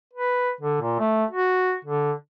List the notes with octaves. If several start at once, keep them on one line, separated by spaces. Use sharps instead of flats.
B4
D3
A#2
A3
F#4
D3